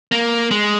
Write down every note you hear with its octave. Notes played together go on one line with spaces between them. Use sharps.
A#3
G#3